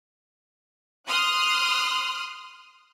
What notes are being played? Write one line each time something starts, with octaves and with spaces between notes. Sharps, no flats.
C6 D#6 F6 F#6